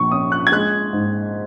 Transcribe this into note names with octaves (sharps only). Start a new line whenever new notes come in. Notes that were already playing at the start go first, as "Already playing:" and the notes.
Already playing: A#1 C#6
C#4 D#6
F#6
G#6
G#3 F#6
G#2